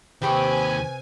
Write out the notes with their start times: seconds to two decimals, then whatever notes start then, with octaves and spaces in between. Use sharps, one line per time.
0.22 D#2 C3 C4 G4 B4 G#5 B5 C#6